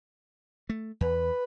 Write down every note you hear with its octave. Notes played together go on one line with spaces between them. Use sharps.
A3
E2 B4